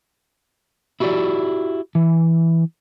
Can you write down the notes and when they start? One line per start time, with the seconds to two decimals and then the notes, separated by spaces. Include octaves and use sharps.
1.00 E4 F#4 G4 C#5 D5 E5
1.95 E3